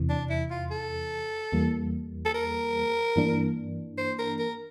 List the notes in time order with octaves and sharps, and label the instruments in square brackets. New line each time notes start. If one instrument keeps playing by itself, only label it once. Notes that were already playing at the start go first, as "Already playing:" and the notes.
Already playing: [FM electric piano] E2 C3 E3
[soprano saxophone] D4
E4
F4
A4
[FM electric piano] E2 E3 G3 A#3
[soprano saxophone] A4
A#4
[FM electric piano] G2 E3 A#3 D4
[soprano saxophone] C5
A#4
A#4